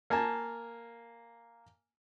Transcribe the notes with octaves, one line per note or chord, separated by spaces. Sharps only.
A#3 G#5 A5